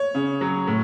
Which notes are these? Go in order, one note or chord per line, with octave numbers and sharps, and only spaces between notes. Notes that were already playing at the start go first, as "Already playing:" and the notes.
Already playing: C#5
C#3
F#3
A2